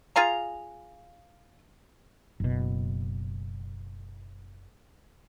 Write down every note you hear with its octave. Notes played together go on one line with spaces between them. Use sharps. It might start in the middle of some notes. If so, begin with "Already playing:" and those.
F4 G#4 F5 A#5
F#1 B2